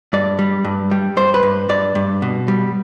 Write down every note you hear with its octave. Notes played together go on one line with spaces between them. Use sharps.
G2 D5
G3
G2
G3
G2 C5
B4
G2
G2 D5
G2
B2
G3